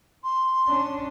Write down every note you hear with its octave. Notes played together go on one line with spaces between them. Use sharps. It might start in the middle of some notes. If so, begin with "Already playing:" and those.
C6
C#4 D4